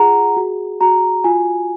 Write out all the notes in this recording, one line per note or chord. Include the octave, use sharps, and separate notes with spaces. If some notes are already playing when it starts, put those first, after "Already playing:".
Already playing: F4 G#4 F#5 A#5
F#4
F#4 A#5
F4 G#5